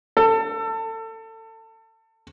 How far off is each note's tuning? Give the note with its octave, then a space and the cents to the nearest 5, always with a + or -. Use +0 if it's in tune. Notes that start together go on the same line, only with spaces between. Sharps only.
A4 +25